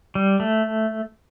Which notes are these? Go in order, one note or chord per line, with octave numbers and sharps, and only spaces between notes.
G3
A3